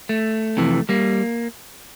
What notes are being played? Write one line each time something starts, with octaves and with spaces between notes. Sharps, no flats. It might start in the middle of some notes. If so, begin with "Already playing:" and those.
A3
F2 C3 E3
G3 A#3